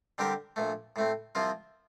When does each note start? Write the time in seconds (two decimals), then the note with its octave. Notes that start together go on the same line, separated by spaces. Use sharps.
0.18 D3 G3 C4 G4 A#4
0.56 A#1 A#2 A3
0.96 A2 A3 C4
1.35 C2 C3 F3 C4 F4